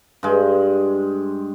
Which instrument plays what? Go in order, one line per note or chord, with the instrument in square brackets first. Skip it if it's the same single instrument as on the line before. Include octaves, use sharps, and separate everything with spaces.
[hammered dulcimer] G2 G#3